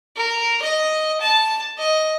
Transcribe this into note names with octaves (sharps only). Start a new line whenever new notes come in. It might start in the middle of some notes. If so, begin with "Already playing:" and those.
A#4
D#5
A5
D#5